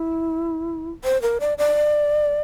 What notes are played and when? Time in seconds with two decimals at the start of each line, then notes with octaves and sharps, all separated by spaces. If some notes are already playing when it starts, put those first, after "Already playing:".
Already playing: E4
1.04 C5
1.22 A#4
1.40 D5
1.58 D5